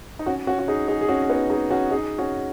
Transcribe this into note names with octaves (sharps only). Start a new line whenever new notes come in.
D#4
C#4 F#4
C#4 F#4
F#4
D#4 G#4
D#4 G#4
G#4
C#4 F#4
C#4
B3 D#4
D#4 G#4
C#4 F#4
D#4 G#4
C#4 F#4